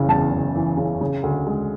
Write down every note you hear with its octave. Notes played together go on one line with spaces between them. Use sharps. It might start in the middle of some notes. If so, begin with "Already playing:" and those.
Already playing: F#1 C#3 E3
E2 A5
F#1
E3
C#3
C#3
D2
G#3